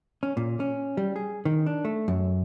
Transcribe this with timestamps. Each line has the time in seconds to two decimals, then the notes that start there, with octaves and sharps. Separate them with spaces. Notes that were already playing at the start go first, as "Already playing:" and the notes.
0.23 C#4
0.37 A#2
0.60 C#4
0.97 G3
1.16 G#4
1.45 D#3
1.66 D4
1.85 A3
2.08 F#2